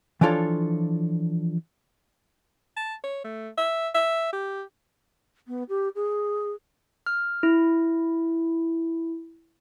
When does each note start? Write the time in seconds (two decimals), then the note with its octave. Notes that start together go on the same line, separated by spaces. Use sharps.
0.21 E3 F3 D4 F4 A4 C#5
2.77 A5
3.04 C#5
3.24 A3
3.57 E5
3.95 E5
4.33 G4
5.47 B3
5.69 G4
5.95 G#4
7.06 F6
7.43 E4